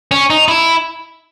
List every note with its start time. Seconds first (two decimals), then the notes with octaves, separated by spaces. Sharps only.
0.11 C#4
0.30 D#4
0.48 E4